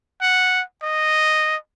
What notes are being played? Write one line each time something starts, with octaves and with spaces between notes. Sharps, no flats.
F#5
D#5